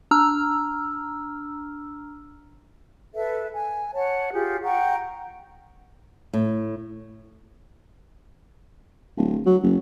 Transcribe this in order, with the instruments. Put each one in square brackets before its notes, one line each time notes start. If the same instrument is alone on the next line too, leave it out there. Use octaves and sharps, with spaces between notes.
[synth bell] D4 A#5 E6 F6
[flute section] A4 B4 E5
G#5
C#5 F#5 A5
F4 G4 G#4
F#5 G5 A#5 C#6
[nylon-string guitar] A2
[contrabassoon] D1
F#3
F#1